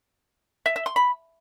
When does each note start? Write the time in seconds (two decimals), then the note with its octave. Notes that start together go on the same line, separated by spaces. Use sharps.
0.66 E5
0.76 E5
0.86 C6
0.96 B5